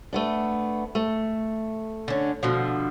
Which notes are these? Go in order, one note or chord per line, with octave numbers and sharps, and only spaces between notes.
A3 B3 D4
A3
D3 C#4
B2 D3 F3